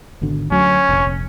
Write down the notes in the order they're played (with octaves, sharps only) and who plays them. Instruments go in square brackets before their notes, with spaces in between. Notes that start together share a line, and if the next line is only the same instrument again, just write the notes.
[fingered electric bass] G#1 B2 D3
[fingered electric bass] D2 F#3 [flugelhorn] C#4
[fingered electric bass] F1 A#1